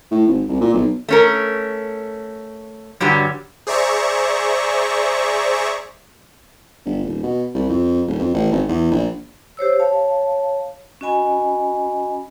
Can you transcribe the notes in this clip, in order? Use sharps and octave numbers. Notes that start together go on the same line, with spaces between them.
A2
G#1
C2
A#2
B1
A3 C#4 A#4
G2 D3 F#3 G3
G#4 C5 D5 E5 A#5 C#6
G1
D#1
B2
C2
F2
D#1
F2
A1
G#1
E2
A#1
G4 C5 C#5 E6
C#5 F5 A5
C#4 F#4 D#5 G#5 B5